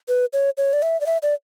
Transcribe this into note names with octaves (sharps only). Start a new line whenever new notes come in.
B4
C#5
C#5
D5
E5
D5
E5
D5